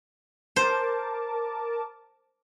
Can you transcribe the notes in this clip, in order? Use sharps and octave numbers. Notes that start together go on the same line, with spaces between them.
A#4 C5 A5 D6